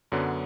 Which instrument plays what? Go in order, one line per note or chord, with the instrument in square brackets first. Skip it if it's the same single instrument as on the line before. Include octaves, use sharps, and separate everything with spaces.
[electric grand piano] F#2 D3 F#3 B3